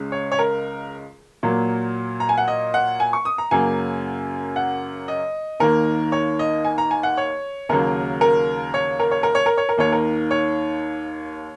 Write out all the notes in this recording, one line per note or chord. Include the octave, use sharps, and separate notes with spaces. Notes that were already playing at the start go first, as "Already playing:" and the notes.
Already playing: C#2 C#3 G#3
C#5
C#5
A#4
A#2 F#3 A#3
A#5
G#5
F#5
D#5
F#5
G#5
C#6
D#6
A#5
F#2 C#3 F#3 A#3 G#5
F#5
D#5
D#2 D#3 A#3 A#4
C#5
D#5
G#5
A#5
G#5
F#5
C#5
D#2 C#3 F#3 A#3 A#4
A#4
C#5
A#4
C#5
A#4
C#5
A#4
C#5
A#4
D#2 D#3 A#3 C#5
A#4
C#5